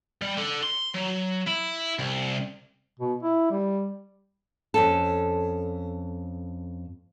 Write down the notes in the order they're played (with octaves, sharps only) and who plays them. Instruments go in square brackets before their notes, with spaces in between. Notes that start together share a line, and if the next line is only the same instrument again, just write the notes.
[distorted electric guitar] G3
D3
C6
F#3
E4
C2
[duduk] B2
E4
G3
[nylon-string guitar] F2 C#4 A4